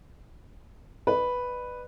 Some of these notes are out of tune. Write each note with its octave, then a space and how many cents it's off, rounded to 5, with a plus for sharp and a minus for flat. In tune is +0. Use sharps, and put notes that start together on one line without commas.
B4 +0 D5 +40